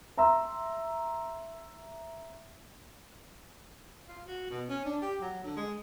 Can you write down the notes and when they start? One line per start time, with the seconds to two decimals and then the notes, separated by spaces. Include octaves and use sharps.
0.17 E5 A#5 C6 E6
4.08 F4
4.27 F#4
4.50 B2
4.69 C#4
4.85 D4
5.02 G4
5.21 F#3
5.44 D3
5.56 G#3